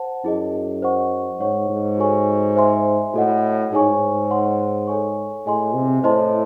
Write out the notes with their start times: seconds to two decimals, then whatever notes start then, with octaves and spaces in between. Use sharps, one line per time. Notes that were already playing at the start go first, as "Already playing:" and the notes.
Already playing: C5 F#5 A5
0.24 F#2 E4 G#4 D#5
0.82 C5 D#5 F#5 C#6
1.40 G#2 C#5 F#5 C#6
1.69 G#2
1.98 F#4 A4 C#5 G#5 C#6
2.56 C5 E5 G#5 C6
3.14 A2 F#4 A4 D#5 F#5
3.72 G#2 D#4 G#4 C#5 G#5 C#6
4.30 C#5 F#5 C6
4.87 A4 C#5 G#5 C#6
5.46 A2 G#4 D#5 G#5 C6
5.75 C3
6.03 A2 E4 C5 D#5 A5 C6